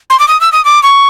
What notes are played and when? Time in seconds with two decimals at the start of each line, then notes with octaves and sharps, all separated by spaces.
0.10 C6
0.20 D6
0.28 D#6
0.41 E6
0.52 D#6
0.65 D6
0.83 C#6